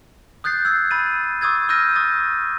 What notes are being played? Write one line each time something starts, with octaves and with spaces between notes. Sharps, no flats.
D#6 F#6 G6 A6 C7
E6 G#6 C7
B5 A6 D#7
C#6 D#6 E6 G#6 A6
C#6 E6 F6 G6 A#6 D#7
C#6 D#6 A6